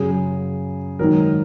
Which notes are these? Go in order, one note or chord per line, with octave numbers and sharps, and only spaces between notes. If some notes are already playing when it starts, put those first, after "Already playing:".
Already playing: F#2 C#3 F#3 G#4
G#2 D#3 F#3 A#4